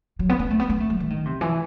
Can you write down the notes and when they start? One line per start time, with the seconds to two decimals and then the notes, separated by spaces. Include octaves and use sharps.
0.19 F#3
0.29 B3
0.39 B3
0.50 A3
0.59 B3
0.70 B3
0.80 A3
0.90 F#3
1.00 E3
1.10 D#3
1.25 C3
1.41 E3